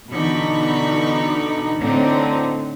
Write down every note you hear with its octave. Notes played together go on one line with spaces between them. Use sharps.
B2 D3 E3 D#4 B5 C#6
A2 D3 C4 D#4